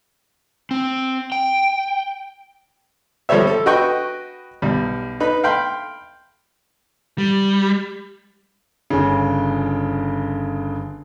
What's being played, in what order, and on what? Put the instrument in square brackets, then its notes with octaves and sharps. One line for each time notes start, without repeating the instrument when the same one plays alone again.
[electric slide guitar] C4
G5
[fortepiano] F3 G3 A4 C5 C#5 E5
A4
F#4 B4 D#5 G5 C#6
B1 G3
D#4 B4 B5
F5 G5 B5 C6
[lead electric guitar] G3
[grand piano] G1 C#3